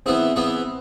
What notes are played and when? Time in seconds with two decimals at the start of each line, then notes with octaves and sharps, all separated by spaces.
0.06 E3 B3 C4 E4 G#4
0.36 E3 B3 E4 G#4